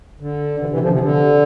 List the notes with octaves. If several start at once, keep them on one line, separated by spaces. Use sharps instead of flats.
D3
C3 E3
C3 E3
D3 F3
C3
D3